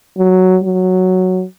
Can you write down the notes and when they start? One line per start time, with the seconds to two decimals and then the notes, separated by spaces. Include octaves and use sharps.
0.18 F#3
0.63 F#3